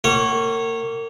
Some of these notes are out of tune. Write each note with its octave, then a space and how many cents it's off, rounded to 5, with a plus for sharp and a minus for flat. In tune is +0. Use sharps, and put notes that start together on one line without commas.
A#3 -30 C#5 -15 F#5 +35